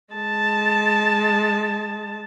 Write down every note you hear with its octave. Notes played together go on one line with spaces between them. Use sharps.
G#3 A5